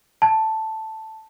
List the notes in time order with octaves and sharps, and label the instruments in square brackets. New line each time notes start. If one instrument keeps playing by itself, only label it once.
[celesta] A5